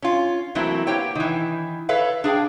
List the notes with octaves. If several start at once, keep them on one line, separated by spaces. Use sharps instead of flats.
C#4 F4
E3 F#3 A3 A#3 C4 E4
A#3 B3 G4 C#5 G5
D#3 E3
A4 B4 C#5 E5 F5
D4 G#4 F5 G5